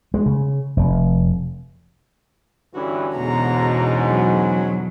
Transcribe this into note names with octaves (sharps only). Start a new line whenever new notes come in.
G#3
C#3
F1
G2 D3 E3 C#4 F#4
E2 G#2 B2 A#5
F#3